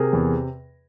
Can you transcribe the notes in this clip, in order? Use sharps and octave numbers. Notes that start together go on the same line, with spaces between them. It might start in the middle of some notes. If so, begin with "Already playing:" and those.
Already playing: C3 G#4 A#4
E2